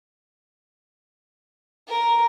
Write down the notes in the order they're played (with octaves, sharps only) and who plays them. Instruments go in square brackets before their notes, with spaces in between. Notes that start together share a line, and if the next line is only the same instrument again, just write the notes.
[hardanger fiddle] A#4